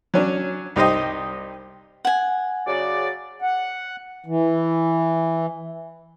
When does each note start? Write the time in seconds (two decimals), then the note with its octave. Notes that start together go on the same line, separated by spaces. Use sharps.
0.14 F#3 C#4 D4
0.76 C2 D#4 G4 C5 D#5
2.05 F#5 G#5
2.67 C#3 F#3 D5
3.42 F#5
4.26 E3